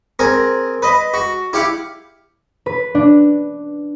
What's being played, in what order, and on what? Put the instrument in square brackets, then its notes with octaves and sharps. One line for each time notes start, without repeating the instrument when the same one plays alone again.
[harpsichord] C4 G#4 A#4
B4 D#5
F#4
E4 G4 F5 F#5
[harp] B4
D4